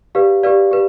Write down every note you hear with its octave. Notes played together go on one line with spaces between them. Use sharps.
G4 B4 D5 F5
G4 B4 D5 F5
G4 B4